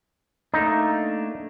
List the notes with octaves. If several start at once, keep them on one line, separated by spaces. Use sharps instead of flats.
A3 A#3 D4 D#4